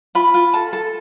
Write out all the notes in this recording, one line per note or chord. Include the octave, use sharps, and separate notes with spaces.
F4 B5
F4
A4 A5
A4